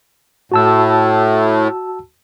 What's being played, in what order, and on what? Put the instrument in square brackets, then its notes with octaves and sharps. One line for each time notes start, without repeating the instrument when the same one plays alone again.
[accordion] A2 [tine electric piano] F#4 A5 E6